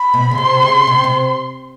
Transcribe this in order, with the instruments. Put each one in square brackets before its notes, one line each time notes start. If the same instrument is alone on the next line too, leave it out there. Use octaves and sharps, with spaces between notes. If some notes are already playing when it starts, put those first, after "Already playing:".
Already playing: [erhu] B5
[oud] B2
C#3
[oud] C3 [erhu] C6
[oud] C#3
C3
C3